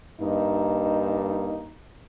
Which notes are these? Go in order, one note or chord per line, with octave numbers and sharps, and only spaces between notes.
G2 A#3 D#4